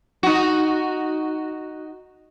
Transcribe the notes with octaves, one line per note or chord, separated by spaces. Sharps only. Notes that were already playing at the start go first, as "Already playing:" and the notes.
D#4 F#4